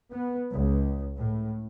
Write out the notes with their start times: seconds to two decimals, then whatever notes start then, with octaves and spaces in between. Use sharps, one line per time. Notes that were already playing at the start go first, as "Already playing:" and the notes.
0.11 B3
0.54 C#2
1.18 A2